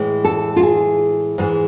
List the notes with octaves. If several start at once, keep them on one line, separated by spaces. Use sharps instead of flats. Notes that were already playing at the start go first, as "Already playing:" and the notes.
Already playing: A2 E3 G#3
A4
F4
G#4
G#2 E3 G#3